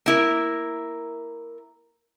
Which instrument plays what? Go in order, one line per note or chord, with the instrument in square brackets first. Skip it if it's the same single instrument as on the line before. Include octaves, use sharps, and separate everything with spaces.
[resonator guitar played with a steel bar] A#3 E4 A#4